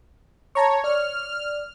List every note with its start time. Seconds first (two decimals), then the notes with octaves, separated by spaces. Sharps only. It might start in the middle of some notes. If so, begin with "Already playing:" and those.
0.55 C#5 A5 A#5 C#6
0.84 D5 F6